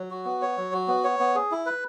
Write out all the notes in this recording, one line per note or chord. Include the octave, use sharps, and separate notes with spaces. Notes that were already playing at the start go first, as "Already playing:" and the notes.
Already playing: F#3
F#4
B3
C#5
F#3
F#4
B3
C#5
B3
G#4
E4
B4